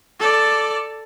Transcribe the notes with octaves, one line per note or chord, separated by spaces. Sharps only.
A4 D5